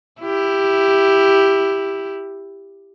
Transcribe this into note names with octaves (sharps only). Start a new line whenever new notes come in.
E4 G4